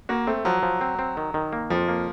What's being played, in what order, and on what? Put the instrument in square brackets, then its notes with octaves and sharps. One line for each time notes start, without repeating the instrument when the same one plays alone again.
[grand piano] A#3 [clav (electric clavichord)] F#4
[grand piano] A3 [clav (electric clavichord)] C4
[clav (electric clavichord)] F3 [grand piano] F#3
[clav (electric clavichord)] F3
C4
C4
D#3
D#3
A#3
[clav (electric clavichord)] F2 [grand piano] F3
[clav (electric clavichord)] A#3